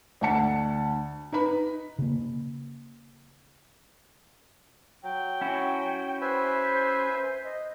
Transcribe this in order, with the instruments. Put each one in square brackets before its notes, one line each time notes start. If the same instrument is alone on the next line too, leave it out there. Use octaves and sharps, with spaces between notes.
[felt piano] D2 D3 F#5 A5 C#7
D#4 B4 B5
[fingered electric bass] C#3 A#3
[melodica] F#3 [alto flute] G5
[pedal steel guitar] C#4 E4 F#4
[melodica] B4 E5 G#5 [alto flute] C5
[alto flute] D#5